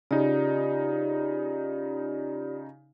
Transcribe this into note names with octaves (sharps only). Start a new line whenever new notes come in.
C#3 D#4 F4 G4 D5